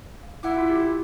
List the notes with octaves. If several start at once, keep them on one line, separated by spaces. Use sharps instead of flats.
F5
E4 F#5 D6
F4
G4